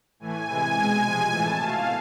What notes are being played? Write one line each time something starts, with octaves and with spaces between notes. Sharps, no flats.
A2 E3 A3 G#5
C3 E3 G#3
B2 G#3
C3 F3 G#3
A2 E3 A3 A5
B2 A3 F5